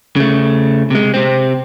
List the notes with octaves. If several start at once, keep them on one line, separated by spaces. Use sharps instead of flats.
C#3 A3
C3 G#3
C3 C4